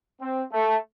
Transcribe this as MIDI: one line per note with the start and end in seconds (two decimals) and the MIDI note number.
0.21 0.42 60
0.52 0.76 57